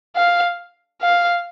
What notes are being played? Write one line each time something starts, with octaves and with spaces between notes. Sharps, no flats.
F5
F5